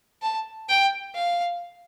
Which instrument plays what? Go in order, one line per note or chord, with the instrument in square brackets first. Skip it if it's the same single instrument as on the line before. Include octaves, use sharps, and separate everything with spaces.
[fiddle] A5
G5
F5